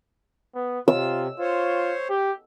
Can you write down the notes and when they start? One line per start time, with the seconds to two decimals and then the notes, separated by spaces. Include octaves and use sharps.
0.55 B3
0.88 C3 F4 E6
1.40 F4 C5 C#5
2.10 G4